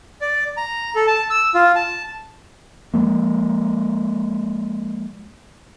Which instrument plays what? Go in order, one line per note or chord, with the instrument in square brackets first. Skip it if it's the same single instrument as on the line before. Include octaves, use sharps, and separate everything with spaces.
[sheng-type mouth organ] D5
A#5
A4
A5
E6
F4
A5
[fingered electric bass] F3 G#3 A#3